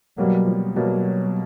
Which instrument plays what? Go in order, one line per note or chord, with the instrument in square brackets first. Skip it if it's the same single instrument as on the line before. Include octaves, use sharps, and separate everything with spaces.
[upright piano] B2 G3 A#3 [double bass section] F#3
[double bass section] F3
[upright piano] B2 G3 A#3 [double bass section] F#3